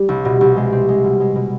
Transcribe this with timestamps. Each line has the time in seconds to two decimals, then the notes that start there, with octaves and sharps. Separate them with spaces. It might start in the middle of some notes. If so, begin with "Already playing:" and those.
Already playing: G3
0.09 C2
0.25 B2
0.41 C2
0.57 G#3
0.72 C4
0.89 G#3
1.04 B2
1.20 G#3
1.36 B2